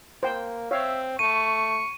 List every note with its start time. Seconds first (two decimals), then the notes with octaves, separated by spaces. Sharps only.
0.23 A#3 C5 G5
0.71 C4 C#5 E5 F5
1.19 A3 C#6 D#7